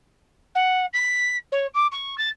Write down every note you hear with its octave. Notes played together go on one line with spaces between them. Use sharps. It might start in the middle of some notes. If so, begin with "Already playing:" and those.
F#5
B6
C#5
D6
C#6
A6